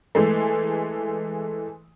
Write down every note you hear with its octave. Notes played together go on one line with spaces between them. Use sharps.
E3 G#3 A3